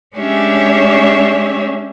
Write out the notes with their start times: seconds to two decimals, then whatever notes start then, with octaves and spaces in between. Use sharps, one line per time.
0.16 G#3 C#4 D4 G4 C#5 E5